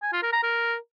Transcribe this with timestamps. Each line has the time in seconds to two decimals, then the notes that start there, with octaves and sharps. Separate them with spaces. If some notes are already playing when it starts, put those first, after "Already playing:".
0.03 G#5
0.13 F4
0.23 A#4
0.33 A#5
0.43 A#4